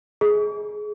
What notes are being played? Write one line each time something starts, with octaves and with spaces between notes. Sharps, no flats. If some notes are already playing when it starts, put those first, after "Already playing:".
G#4